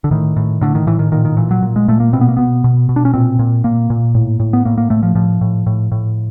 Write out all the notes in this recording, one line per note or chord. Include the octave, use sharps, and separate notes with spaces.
D3
A2 D#3
A2
A2 D3
D#3
A2 E3
D#3
A#2 D#3
D#3
A#2 E3
F#3
A#2
G#3
A#2 A3
A#3
B2 C4
B3
A#3
B2 B3
B2
B2
D4
C#4
A#2 C4
A#2
A#2 A#3
A#2
A2
A2
B3
A2 A#3
A#3
A2 A3
F3
A2 F3
A2
A2
A2